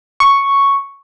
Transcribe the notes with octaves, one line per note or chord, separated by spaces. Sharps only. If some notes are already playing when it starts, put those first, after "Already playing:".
C#6